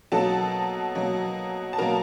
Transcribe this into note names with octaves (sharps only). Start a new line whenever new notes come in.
B2 F#3 A#3 A4 A5
B2 F#3 A#3
A5
B2 F#3 A#3 A#4 A#5